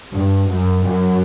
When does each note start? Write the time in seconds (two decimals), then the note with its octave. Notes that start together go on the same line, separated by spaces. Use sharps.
0.13 G2
0.48 F#2
0.84 F#2